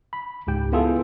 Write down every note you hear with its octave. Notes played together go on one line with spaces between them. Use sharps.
B5
C#2 G#2 G4 G5
B3 E4 F4 G#4 A4